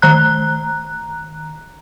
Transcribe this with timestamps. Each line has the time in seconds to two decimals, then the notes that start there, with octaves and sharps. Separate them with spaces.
0.02 D#3 A#5 F#6